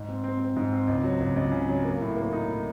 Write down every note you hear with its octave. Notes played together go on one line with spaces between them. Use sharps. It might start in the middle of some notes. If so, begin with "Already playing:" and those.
Already playing: G#2
C4
C4
C4
G#2
C4
C#2
F#3
C#2
C#2
C#3
F#3
A#3
A2
A#3
D#4
A2